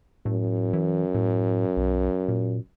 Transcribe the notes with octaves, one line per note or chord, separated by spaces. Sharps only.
F#2 A2
E3
A2
B1
A#2